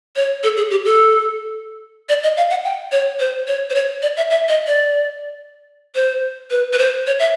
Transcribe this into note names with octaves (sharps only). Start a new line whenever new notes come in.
C#5
A4
G#4
G4
A4
D5
D#5
F5
F#5
G5
C#5
C5
C#5
C5
C#5
D5
E5
E5
D#5
D5
C5
B4
B4
C5
C#5
E5